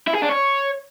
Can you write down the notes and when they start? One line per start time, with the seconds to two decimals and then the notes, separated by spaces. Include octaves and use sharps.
0.07 E4
0.15 G#4
0.22 D4
0.29 C#5